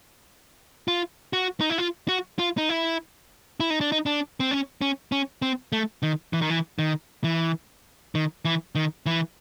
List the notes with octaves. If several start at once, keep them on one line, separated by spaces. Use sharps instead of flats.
F4
F#4
D#4
E4
F4
F#4
F4
D#4
E4
E4
D#4
D4
D#4
D4
C4
C#4
C#4
C#4
C4
A3
D#3
E3
D#3
E3
D#3
E3
D#3
E3
D#3
E3